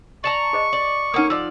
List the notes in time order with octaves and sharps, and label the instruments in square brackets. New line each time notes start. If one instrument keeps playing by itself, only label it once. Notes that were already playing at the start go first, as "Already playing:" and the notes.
[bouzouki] D5 A5 A#5 [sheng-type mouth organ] C#6
[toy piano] G#4 C5 D#5
[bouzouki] D5
[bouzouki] A#3 C#4 [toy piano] D#4 F#5 D#6
[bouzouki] F3 D5 [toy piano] E6